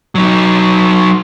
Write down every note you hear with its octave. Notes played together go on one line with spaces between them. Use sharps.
F#3 D#4